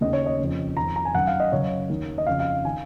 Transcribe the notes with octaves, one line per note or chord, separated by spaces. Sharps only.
D#2 C#3 D#5
C#5
D#5
F2 C#3
F2 D#3 A#5
A#5
G#5
F#2 D#3 F#5
F5
D#5
F#2 C#3 C#5
D#2 D#3
D#5
F2 C#3 F5
F5
D#3 G#5